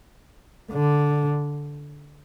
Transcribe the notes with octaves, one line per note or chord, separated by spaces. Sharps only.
D3